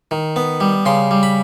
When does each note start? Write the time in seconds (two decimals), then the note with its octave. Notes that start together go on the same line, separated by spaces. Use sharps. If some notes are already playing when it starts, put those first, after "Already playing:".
0.11 D#3
0.36 B3
0.60 G3
0.86 C#3 C6
1.11 G3
1.23 B5